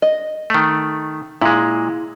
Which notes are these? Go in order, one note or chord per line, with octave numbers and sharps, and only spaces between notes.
D#5
D#3 A3
A#2 G#3 E4